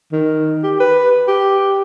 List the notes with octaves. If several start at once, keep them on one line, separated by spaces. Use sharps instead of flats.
D#3
G4
B4
G4